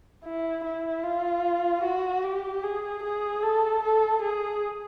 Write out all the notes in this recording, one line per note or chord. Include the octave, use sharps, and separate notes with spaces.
E4
E4
F4
F#4
G4
G#4
G#4
A4
A4
G#4